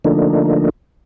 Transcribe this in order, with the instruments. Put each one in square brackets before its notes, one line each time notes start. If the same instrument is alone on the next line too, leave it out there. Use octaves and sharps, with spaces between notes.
[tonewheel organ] D3 F3 A3 A#3 D4 D#4